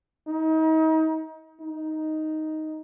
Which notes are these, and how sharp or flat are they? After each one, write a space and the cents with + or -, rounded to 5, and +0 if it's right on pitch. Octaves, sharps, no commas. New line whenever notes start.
D#4 +35
D#4 +5